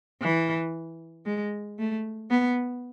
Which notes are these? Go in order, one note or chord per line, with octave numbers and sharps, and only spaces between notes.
E3
G#3
A3
B3